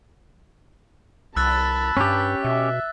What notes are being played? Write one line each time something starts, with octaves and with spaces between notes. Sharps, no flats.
C2 A5 B5 E6 F#6 A6
G2 C#4 G4 B6
B2 E5